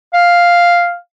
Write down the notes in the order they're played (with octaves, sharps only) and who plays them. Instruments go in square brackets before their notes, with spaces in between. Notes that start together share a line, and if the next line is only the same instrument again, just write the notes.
[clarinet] F5